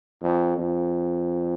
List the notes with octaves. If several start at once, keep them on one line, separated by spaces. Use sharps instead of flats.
F2
F2